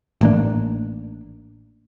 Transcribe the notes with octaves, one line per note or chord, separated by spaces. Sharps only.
A1 A#3 D4